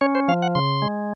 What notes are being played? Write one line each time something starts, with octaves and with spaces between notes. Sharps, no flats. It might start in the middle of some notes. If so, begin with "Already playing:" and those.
C#4 C#5
C5
F3 F5
F#5
C#3 C6
G#3